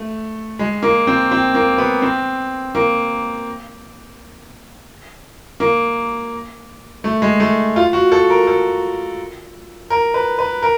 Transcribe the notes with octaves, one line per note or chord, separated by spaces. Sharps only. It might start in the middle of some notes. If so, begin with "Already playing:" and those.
Already playing: A3
G#3
A#3
C4
C4
A#3
B3
C4
A#3
A#3
A3
G#3
A3
F4
F#4
A4
A#4
A4
A#4
B4
B4
A#4